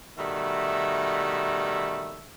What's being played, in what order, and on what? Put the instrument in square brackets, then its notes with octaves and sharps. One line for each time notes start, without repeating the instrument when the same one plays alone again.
[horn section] B2 D#3 G3 A3 E5